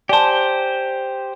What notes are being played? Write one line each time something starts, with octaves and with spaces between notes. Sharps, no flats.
G4 C5 D5 G#5 A5